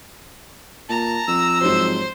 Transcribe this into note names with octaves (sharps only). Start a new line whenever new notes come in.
A#2 A5 A#5
F2 E6
G#2 F#3 C5